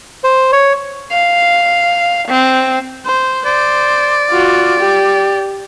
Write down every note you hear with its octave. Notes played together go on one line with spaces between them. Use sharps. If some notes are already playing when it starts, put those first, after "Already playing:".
C5
C#5
F5
C4
C5
C5 D5
F4 F#4
G4